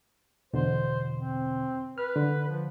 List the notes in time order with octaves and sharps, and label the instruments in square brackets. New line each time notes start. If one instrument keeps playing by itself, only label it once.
[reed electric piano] E2 B2 D3 [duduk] C5
[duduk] C4
[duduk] B4 [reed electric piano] F6
[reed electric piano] D3
[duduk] F3